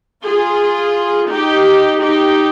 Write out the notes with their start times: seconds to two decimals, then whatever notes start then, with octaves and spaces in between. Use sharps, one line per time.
0.25 F4 G#4
1.30 D#4 G4
2.01 D#4 G4